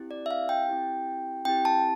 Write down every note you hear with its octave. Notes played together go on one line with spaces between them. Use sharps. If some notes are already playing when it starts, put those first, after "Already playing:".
Already playing: C4 E4 G4
D5
E5
F5
G5
C4 E4 G4
C4 E4 G4 G5
A5